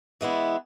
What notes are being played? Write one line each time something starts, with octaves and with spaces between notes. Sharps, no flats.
E3 G#3 B3 E4